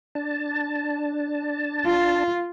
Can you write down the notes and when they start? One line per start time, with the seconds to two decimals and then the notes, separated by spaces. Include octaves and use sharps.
0.15 D4 A5
1.86 F4